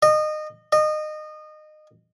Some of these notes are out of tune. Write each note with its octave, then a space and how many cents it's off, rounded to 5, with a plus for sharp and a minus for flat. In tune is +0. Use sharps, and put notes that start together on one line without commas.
D#5 -25
D#5 -25